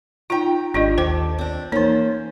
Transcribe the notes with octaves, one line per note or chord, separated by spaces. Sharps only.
D#4 F4 G5 A#5
G#1 G3 D4 F4 D#5
D#2 A4 C5 G5 D6
C4 D4
E3 A#3 C#4 D#4 C5